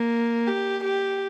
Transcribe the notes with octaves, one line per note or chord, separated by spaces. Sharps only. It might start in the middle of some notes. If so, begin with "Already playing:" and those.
Already playing: A#3
G4
G4